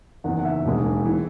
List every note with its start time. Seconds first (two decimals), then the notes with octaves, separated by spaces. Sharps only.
0.24 F#1 E2 D#3 F#5
0.39 F#5
0.45 E5
0.65 E1 D#2 D#3 G#3
1.05 E3